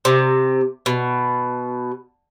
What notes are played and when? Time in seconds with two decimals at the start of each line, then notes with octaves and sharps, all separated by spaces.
0.05 C3
0.86 B2